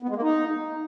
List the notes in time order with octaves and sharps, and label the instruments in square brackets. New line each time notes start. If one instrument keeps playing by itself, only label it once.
[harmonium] B3
G#3
A#3
D#4